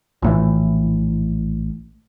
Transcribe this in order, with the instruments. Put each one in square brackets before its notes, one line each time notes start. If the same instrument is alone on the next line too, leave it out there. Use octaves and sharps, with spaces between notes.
[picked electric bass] A#1 A2 E3